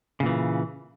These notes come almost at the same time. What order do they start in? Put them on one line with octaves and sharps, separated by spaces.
C#3 A#2 E3